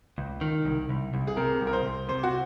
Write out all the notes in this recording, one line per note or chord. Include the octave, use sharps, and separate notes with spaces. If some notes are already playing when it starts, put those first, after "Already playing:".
C#2
D#3
C2
C2
C2
G#4
C3 A#4
C2
A#4
C5
C2
C3 C5
F#4